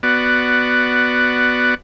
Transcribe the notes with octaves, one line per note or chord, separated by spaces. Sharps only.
B3 F#4 D5